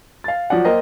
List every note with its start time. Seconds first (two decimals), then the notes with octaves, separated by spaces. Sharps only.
0.24 F5 A6
0.50 F3 F#3 D5 F#5
0.64 A#3 A#4 C5 D#5 G5